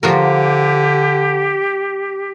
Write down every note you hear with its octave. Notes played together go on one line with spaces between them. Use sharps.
D3 F3 F#4 G4 A#4